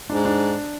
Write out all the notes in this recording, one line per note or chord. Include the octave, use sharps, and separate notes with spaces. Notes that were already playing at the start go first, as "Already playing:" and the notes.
G#2 D4
D4